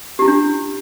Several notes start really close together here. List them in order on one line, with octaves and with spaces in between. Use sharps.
G4 E4 F4 D4